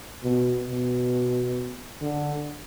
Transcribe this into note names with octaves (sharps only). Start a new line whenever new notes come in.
B2
B2
D3